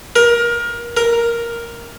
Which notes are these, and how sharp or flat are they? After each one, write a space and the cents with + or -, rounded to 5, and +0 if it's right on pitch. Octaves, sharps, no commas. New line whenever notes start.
A#4 +25
A#4 +5